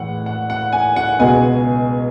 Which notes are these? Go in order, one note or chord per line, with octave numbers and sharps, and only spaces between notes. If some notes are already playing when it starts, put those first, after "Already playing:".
Already playing: A2 E3 G#3 F#5
F#5
F#5
G#5
F#5
C#2 B2 G#3 G#5